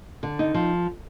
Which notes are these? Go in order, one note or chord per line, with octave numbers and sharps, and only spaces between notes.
D3
D#4
F3